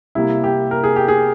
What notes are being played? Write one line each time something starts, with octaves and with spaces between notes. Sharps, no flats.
C2 C3 G3 A#3 E4
G4
A#4
G#4
G4
G#4